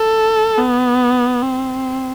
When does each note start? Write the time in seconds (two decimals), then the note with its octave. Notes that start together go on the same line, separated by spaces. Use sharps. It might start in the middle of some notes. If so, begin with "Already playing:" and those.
Already playing: A4
0.58 B3
1.42 C4